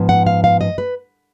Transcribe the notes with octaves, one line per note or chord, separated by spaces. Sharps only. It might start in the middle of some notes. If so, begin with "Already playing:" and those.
Already playing: G#2 F3 B3
F#5
F5
F5
D#5
B4